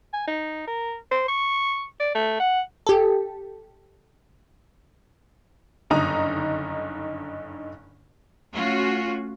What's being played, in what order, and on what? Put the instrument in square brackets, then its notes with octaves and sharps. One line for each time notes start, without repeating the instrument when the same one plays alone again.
[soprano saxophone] G#5
D#4
A#4
C5
C#6
D5
A3
F#5
[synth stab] G4 A4
[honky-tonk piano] F#1 G2 D3 D#4 A#5 D#6
[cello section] A3 C#4 F4 F#4